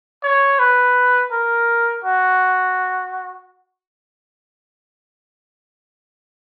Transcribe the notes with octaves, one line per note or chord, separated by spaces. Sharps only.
C#5
B4
A#4
F#4